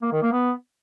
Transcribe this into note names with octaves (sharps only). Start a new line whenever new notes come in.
A#3
D#3
A#3
B3